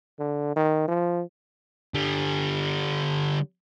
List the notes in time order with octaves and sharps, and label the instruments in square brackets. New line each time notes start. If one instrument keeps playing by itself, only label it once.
[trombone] D3
D#3
F3
[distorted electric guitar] D3 G3